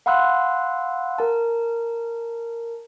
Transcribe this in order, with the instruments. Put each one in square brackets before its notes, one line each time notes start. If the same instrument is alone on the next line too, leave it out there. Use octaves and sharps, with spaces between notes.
[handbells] F5 F#5 B5 C6 E6 F#6
A#4 A5